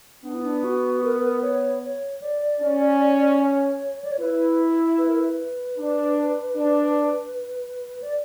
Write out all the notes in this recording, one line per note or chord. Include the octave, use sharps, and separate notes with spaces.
B3 D4
E4
D4
F#4
A#4
B4
A#4
C#5
C#5
D5
C#4
C#5
D5
C#5
E4 B4
B4
A#4
B4
D4
D4
D5